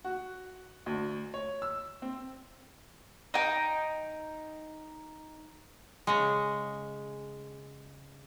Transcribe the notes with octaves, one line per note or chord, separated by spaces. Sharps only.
F#4
D2
C#5
E6
C4
D#4 G5
C#3 G#3